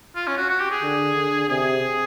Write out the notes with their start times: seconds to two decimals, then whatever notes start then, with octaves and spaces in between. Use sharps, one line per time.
0.15 F4
0.27 C#4
0.37 F#4
0.49 F#4
0.60 G4
0.71 G#4
0.83 D3
1.15 D3
1.48 C3 G#4